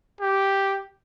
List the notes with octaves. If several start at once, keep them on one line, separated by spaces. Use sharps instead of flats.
G4